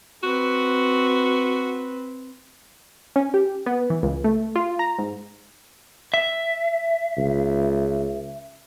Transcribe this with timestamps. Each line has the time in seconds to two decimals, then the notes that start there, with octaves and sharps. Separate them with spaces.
0.23 C4 F#4 B4
3.16 C#4
3.34 G4
3.66 B3
3.90 E3
4.03 C#2
4.24 A3
4.56 F4
4.79 A#5
4.98 G#2
6.14 E5
7.18 C#2